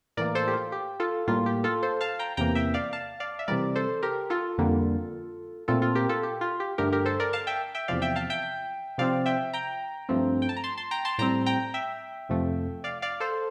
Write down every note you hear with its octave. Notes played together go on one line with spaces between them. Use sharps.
A2 E3 A#3 A#4 D5
A4 C5
G4
F4
G4
F4 A4
A2 G3 A#3 F4
G4
F4 A4
A4 C5
F5 A5
G5 A#5
E2 C3 E3 A#3 G5 A#5
E5 G5
D5 F5
F5 A5
D5 F5
E5
C3 E3 G3 A#4 D5
A4 C5
G4 A#4
F4 A4
F2 D3 G3 A#3
A#2 A3 C4 F4 A4
F4 A4
G4 A#4
F4 A4
G4
F4
G4
G2 D3 A3 G4 A#4
G4 A#4
A4 C5
A#4 D5
F5 A5
E5 G5
E5 G5
E2 C3 F3 D5 F5
E5 G5
F5 A5
E5 G5
C3 F3 C4 D5 F5
E5 G5
G5 A#5
G2 F3 A3 C4
G5
A5
A#5
A5 C6
A5 C6
G5 A#5
A5 C6
A2 G3 C4 G5 A#5
G5 A#5
E5 G5
F2 C3 F3 A3
D5 F5
D5 F5
A4 C5